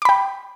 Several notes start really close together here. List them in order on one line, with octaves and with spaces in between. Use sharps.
D6 B5 G5